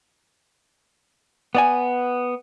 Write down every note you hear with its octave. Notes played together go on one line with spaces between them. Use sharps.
B3 D5 G#5